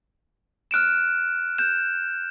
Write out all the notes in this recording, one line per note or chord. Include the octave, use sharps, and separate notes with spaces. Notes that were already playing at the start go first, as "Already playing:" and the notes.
F6 F#6 D7 E7
F#6 G6 E7